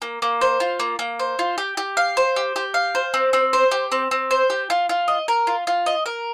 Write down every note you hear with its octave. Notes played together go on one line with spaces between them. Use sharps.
A#3
A#3
C5
F4
A#3
A#3
C5
F4
G4
G4
F5
C5
G4
G4
F5
C5
C4
C4
C5
G4
C4
C4
C5
G4
F4
F4
D#5
A#4
F4
F4
D#5
A#4